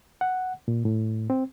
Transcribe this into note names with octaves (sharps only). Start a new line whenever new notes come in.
F#5
A#2
A2
C4